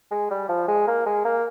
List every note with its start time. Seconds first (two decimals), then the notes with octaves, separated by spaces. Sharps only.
0.11 G#3
0.31 G3
0.49 F3
0.68 G#3
0.88 A#3
1.06 G#3
1.25 A#3